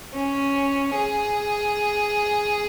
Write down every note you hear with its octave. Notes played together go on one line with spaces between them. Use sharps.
C#4
G#4